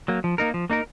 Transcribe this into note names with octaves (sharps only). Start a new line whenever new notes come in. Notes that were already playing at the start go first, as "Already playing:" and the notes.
F#3 A#3
F3
A#3 D#4 A#4
F3
A#3 D#4 A#4